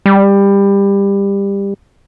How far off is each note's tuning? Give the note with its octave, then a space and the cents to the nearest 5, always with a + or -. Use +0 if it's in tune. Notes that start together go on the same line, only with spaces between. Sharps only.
G3 +20